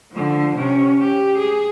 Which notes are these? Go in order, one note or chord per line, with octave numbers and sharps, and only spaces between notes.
D3 F3
C3 C#4
G4
G#4